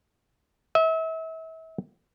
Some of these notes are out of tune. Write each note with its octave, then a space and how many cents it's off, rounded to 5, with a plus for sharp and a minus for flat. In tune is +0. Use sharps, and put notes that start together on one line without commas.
E5 -35